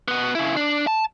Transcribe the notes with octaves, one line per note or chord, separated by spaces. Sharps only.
B2 B3
C#3 E4
D4
A5